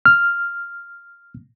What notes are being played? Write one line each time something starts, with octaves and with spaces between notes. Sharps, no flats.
F6